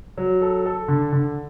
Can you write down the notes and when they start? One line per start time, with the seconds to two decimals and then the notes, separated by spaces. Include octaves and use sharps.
0.18 F#3
0.42 A4
0.66 A4
0.88 D3
1.12 D3